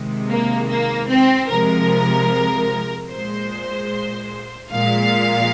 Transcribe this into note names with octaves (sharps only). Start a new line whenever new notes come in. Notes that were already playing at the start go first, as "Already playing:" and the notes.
Already playing: C3 D#3 G#3
A#3
A#3
C4
C3 F3 G#3 A#4
A#2 G#3 C5
A#2 F3 G#3 F5